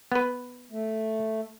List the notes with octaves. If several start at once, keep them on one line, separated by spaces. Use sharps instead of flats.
B3 B4
A3